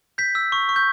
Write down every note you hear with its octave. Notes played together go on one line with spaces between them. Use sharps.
G6 B6
E6
C#6
C#6
G6